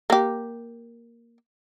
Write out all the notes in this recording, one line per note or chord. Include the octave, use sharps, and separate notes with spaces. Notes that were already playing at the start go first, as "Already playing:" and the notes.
A#3 G4